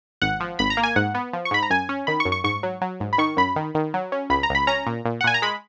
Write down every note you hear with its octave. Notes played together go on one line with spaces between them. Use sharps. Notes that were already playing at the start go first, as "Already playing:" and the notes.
G#1 F#5
F3
G#1 B5
A#5
A#3
G#5
G#2 F#5
B3
F3
C#6
G#2 B5
A#5
F#2 G#5
C#4
D#3 B5
C#6
F#2
C#6
G#2 C#6
F#3
F#3
G#2
B5
D#3 C#6
F#2 B5
D#3
D#3
F#3
C#4
C#2 B5
A#5
C#2
B5
C#4 A#5
A#2
A#2
F#5
A#2 G#5
A#5
G#3 B5